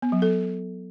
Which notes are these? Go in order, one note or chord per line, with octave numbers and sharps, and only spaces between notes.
B3
F#3
A4